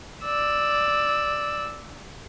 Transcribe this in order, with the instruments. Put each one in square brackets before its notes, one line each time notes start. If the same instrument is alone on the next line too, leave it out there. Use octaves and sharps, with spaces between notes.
[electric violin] D5 E6